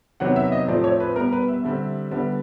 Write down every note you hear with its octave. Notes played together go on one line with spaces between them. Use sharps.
C3 D#3 F#3 B3 F#5
E5
D#5
A2 F3 A3 C4 D5
C#5
B4
B2 G3 B3 A#4
B4
E5
D3 G3 C4
D3 G3 B3